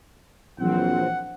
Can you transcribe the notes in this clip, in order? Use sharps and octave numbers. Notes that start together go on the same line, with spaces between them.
A#1 E3 F#3 C4 F#5